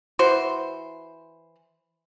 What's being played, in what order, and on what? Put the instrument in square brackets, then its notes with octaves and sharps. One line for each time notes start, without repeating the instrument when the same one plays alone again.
[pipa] E3 F#4 C5